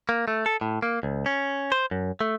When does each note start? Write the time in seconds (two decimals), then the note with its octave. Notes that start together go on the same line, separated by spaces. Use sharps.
0.09 A#3
0.28 A3
0.46 A4
0.61 A2
0.82 A#3
1.03 C#2
1.26 C#4
1.72 C5
1.91 F#2
2.21 A3